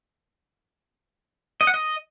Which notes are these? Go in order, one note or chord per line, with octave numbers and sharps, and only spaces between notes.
D#5
F#5
D#5